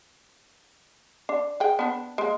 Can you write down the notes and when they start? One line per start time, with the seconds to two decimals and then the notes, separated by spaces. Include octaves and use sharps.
1.29 D4
1.60 G#4 G5
1.79 B3 D4
2.18 G#3 A#3